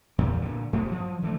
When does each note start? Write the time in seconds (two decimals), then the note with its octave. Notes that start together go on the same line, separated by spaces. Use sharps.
0.18 E2 A#2 G3
0.42 A#2 D3
0.73 G2 F3 A3 A#3
0.88 F3 F#3
1.22 D3 E3 A3